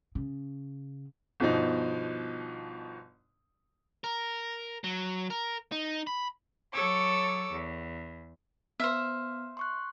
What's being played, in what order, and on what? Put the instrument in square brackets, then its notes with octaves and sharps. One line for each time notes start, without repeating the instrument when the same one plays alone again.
[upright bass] C#3
[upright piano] G1 B2 F3 D#4
[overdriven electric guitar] A#4
F#3
A#4
D#4
B5
[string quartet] F#3 A4 C#5 D6 E6
E2
[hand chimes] B3 F6 [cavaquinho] C5 E5
[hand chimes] C6 C#6 F#6